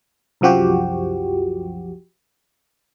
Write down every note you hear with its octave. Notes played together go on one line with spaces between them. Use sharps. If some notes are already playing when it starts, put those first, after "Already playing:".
C2 F#2 F3 F#4 G4